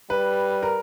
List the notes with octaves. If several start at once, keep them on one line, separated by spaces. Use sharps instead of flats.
G3 B4
A#4